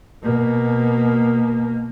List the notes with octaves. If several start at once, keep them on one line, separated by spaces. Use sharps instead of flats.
B2 A#3